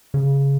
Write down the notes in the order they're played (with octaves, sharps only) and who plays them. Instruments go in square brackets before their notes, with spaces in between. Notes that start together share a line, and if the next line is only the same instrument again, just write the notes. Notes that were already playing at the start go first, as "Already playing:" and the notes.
[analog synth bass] C#3